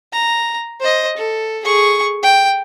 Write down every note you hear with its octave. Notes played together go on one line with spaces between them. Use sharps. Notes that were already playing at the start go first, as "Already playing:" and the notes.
A#5
C5 D#5
A4
G#4 C#6
G5